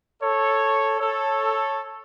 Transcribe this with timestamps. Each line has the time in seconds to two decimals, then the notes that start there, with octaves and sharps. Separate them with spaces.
0.22 A4 C#5
1.00 A4 C#5